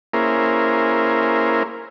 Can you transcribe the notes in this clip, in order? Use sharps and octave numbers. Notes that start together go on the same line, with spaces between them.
A#3 C#4 E4 G#4 A#4 C5